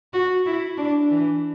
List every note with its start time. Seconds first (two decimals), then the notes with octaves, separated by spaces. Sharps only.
0.13 F#4
0.46 E4
0.78 D4
1.10 E3